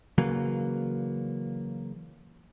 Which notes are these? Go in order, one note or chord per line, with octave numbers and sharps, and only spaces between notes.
C#3 E3 F#3 A#3